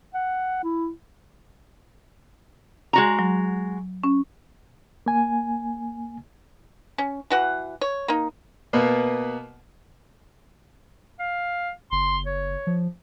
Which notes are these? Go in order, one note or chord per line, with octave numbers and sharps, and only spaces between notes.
F#5
E4
G#3 F#4 A#5
F#3
C#4
A#3 G#5
C#4
E3 F#4 F#5
C#5
A#3 D#4
B2 A#3 B3 B4
F5
F#1 C6
C#5
F3